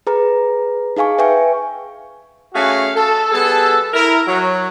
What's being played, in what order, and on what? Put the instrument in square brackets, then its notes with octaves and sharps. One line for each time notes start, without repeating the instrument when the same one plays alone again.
[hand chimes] G#4 B4 A#5
D#4 G#4 F5 G#5 C#6
B4 E5 G5 G#5 C#6
[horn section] A3 C#4 F#4 G#4 F5 G#5
A4
G3 B3 G#4 A4
E4 A#4
F#3